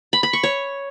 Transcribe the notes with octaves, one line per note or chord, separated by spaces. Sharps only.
B5
B5
C#6
C#5